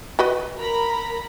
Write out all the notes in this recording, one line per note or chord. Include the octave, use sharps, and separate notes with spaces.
F#4 B4 D#5
A#4 A#5 B5